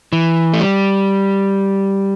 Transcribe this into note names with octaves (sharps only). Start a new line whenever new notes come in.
E3
A3
G3